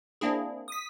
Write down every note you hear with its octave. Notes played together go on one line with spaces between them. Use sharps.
A#3 C4 D4 E4 G#4
D#6 B6